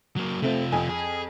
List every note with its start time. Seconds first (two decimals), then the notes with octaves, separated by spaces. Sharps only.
0.17 F#3 A#3
0.42 C3 A3 C4 F4
0.72 F2 G#5
0.89 G#4